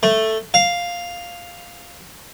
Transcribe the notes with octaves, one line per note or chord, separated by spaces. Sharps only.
A3
F5